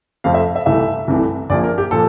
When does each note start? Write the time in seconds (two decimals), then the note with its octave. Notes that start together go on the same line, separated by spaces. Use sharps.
0.24 F2 C3 F3 A3 C4 F5
0.34 E5
0.56 E5
0.66 C2 C3 E3 A3 E5
1.08 C2 C3 E3 A3
1.50 A#1 A#2 F3 D5
1.64 A#4
1.78 G4
1.91 A#2 F3 A4